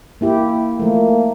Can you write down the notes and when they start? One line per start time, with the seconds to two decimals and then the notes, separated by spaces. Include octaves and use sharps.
0.21 A#3 E4 G4
0.79 F3 A3 A#3